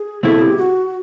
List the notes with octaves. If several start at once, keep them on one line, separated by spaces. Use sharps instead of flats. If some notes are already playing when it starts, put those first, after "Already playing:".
Already playing: G#4
C#2 B2 G#3 C4 E4 A4
G4
F#4